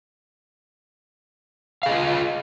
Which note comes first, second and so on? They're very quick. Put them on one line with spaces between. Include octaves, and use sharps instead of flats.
F5 G#4 D#5 F4